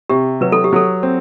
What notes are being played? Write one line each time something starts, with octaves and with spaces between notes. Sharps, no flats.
C3 G4
F#3 B4
A4
G4
F#3 A4
C4